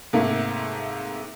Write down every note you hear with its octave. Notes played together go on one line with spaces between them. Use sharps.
G#2 C3 A3 A#3